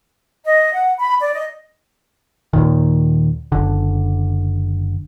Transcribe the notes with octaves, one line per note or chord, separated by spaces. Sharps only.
D#5
F#5
B5
D5
D#5
D#2 A#2 D#3
F#1 D3